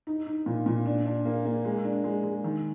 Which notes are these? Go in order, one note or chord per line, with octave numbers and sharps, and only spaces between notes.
D#4
D#4
A#2
A#2
D4
D4
A#3
A#3
G#3
D4
G#3
G#3
D#3